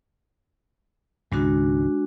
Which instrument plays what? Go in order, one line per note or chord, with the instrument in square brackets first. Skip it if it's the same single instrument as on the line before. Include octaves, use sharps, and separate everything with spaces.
[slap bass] C#2 G#2 D#3 [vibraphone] G#3 D4 F#4